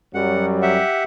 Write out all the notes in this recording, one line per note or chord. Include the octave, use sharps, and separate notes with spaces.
F#2 F#3 G3 F#5
G4 E5 F#5